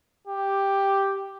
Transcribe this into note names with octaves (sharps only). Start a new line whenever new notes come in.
G4